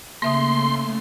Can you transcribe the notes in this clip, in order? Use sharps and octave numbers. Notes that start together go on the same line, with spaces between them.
C#3 A3 A#3 E5 C6 D#6